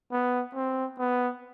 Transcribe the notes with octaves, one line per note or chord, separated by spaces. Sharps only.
B3
C4
B3